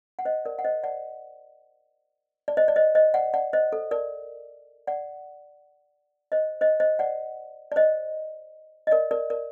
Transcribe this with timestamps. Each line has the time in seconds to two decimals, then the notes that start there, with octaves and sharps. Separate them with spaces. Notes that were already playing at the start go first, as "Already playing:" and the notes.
0.19 F#5
0.25 C5 D#5
0.45 A#4 D5
0.59 F#5
0.64 C5 D#5
0.83 D5 F#5
2.48 D5
2.57 C5 D#5
2.68 D5
2.76 C5 D#5
2.95 C5 D#5
3.14 D5 F#5
3.34 D5 F#5
3.53 C5 D#5
3.73 A4
3.91 A#4 D5
4.87 D5 F#5
6.32 C5 D#5
6.61 C5 D#5
6.80 C5 D#5
6.99 D5 F#5
7.72 D5
7.76 C5 D#5
8.87 D#5
8.91 A#4 D5
9.11 A#4 D5
9.30 A#4 D5